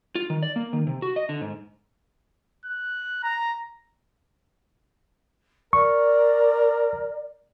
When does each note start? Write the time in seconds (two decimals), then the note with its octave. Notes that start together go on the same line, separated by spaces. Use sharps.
0.15 F4
0.30 D#3
0.43 D5
0.56 A#3
0.73 D#3
0.87 C3
1.02 F#4
1.16 D#5
1.29 D3
1.41 G#2
2.65 F#6
3.23 A#5
5.73 A#4 D5 C#6